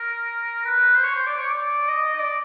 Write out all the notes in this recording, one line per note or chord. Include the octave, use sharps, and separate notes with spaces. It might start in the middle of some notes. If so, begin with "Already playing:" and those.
Already playing: A#4
B4
C5
C#5
C5
D5
C#5
D5
D#5
D#5
D5